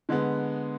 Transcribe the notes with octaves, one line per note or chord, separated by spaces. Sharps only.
D3 G#3 B3